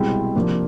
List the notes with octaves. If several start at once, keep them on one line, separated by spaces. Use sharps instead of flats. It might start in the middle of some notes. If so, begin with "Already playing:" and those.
Already playing: C2 B2 G#3 C4 E4
C3 F3 A#3 D4